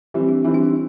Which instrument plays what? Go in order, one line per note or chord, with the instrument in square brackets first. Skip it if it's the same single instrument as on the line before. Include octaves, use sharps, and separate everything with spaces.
[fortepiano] E3 G3 C4
[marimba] D4
[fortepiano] E3 G3 C4 [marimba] D#4
[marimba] D4
D#4